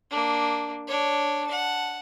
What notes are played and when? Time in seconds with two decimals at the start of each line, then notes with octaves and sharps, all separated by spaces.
0.10 A#3 D4
0.88 D4 C#5
1.47 F#5 A5